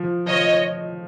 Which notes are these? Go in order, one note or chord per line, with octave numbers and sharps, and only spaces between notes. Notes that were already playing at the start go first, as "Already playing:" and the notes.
Already playing: F3
F3 C#5 D#5